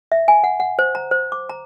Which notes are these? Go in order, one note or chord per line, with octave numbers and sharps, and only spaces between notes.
E5
G#5
F#5
F#5
C5
A#5
C5
D6
A#5